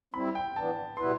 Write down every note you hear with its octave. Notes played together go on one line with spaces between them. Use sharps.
G3 C4 E4 B5
G5
E3 B3 D4 A5
B2 G3 B3 E4 B4 C6